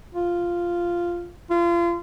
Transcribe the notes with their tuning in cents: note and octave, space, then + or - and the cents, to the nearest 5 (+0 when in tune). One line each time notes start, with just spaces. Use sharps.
F4 -5
F4 -30